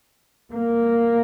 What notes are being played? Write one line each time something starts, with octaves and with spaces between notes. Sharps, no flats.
A#3